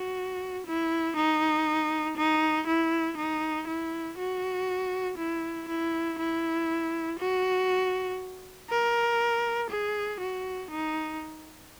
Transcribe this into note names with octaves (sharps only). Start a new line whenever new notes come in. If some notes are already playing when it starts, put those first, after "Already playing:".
Already playing: F#4
E4
D#4
D#4
E4
D#4
E4
F#4
E4
E4
E4
F#4
A#4
G#4
F#4
D#4